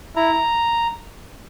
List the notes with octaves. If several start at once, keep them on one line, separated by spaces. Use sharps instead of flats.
E4 A#5